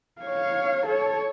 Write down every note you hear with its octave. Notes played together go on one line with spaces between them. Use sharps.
C#5 F5
A4 C#5